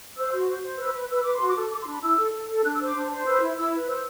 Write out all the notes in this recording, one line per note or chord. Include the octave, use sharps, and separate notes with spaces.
C5 E6
F#4
C5
C5
B4 E6
B4
B4 E6
B4 D6
C6
F#4
D6
A4
A4 D6
C6
D4
B5
E4 E6
A4
A4
A4
D4 F#6
E6
C5 D6
D4
C5
B4 E6
E4
E4 E6
B4
C5 E6